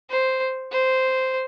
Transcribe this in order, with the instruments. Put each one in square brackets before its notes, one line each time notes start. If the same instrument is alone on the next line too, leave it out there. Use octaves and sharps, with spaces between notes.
[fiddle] C5
C5